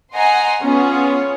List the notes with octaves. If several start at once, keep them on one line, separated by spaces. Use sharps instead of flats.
D#5 F#5 G#5 A#5 C6
B3 C#4 F4 G#4 C#5